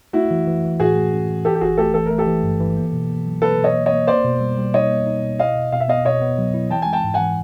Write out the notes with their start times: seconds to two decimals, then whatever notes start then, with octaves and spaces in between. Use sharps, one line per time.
0.13 A3 E4 F#4
0.31 E3
0.47 E3
0.64 E3
0.80 A2 F#4 G#4
0.96 A3
1.12 C#4
1.29 E3
1.45 E3 G4 A4
1.55 G4
1.61 G1 F#4 G#4
1.78 A3 G4 A4
1.94 E3 A4
2.06 A3 A#4
2.18 G4 A4
2.27 E3
2.43 G2
2.60 E3
2.77 A#3
2.93 B2
3.10 A#3
3.27 F#3
3.42 A#3 A4 B4
3.58 B2
3.64 C#5 D#5
3.75 A#3
3.86 C#5 D#5
3.92 A#3
4.07 A#3 C5 D5
4.25 B2
4.40 G3
4.58 G3
4.74 D#4 C#5 D#5
4.90 A#3
5.07 D#4
5.23 B2
5.39 E4 D#5 F5
5.55 B2
5.72 B2 F5
5.80 E5
5.88 B3 D#5 F5
6.05 B2 C#5 D#5
6.21 B3
6.38 F#3
6.54 E4
6.70 E3 G5 A5
6.82 G#3 G#5
6.93 G5 A5
7.04 G#2
7.14 F#5 G#5
7.20 E3